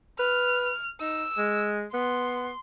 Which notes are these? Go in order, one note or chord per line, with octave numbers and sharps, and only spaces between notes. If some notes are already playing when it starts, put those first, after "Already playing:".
B4 F6
D#4 E6
G#3
B3 C6